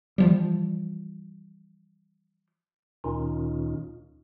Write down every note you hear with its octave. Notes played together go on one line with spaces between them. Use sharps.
E3 F3 G3
D2 A#2 D#3 C#4 D#4 F4